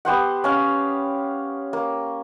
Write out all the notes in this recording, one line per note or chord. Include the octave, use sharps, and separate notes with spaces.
B3 G4 C5 F#5
C#4 F5
A#3